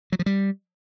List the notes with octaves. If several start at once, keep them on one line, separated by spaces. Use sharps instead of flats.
F#3
F3
G3